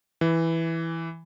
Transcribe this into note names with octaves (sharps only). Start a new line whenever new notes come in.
E3